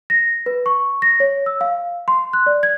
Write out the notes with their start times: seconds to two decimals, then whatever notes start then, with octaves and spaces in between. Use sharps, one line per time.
0.10 A#6
0.46 B4
0.66 C#6
1.02 A#6
1.20 C#5
1.46 E6
1.61 F5
2.08 C6
2.33 F#6
2.46 D5
2.63 G#6